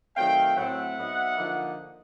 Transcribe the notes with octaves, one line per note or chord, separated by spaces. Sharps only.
D#3 F#3 A3 C4 F5 G5
A2 F#3 A3 C4 E5 F#5
F#3 B3 D#4
D3 F3 A#3 D#4